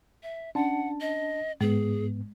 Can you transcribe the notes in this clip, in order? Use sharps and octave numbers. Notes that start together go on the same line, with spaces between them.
E5
C#4 D4 F#5 A5
D#5
G#2 G#3 B3 G#4